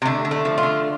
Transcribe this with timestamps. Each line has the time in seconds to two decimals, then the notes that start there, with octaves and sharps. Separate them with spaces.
0.02 C3
0.05 D3 A3
0.25 D3
0.31 A3
0.45 F3
0.58 F4
0.63 D3